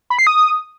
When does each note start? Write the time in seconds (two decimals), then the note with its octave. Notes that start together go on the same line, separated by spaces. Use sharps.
0.10 B5
0.19 C7
0.27 D#6